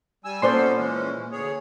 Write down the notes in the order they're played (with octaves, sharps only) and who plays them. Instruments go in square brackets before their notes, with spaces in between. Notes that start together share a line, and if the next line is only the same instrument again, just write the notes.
[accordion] G3 G#5 E6
[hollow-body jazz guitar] A#2 [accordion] B3 C#4 A4 [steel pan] C5 D5 C6
[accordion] E3 G#3 C#4
D2 G#4 C#5